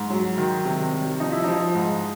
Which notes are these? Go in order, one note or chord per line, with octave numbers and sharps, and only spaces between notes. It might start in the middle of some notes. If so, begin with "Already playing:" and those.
Already playing: G#2
F#3
D#3
C3
G3
F3 D#4
E4
F3 D#4
G#2